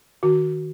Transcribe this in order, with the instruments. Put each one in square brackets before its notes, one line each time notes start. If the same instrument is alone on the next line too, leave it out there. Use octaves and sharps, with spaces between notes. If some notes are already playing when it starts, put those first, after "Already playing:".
[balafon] D#3 F#4